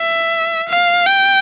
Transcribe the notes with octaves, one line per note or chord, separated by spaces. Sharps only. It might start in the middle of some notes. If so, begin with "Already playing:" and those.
Already playing: E5
F5
G5